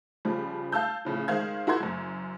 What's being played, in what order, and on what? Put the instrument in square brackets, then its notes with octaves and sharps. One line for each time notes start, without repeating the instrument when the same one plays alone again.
[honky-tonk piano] C#3 F3 G3
F5 A5 E6 G6
A2 C#3 F3
D#3 G#3 C5 F5 G#6
E4 F#4 A#4 C6 G#6
F#1 F#2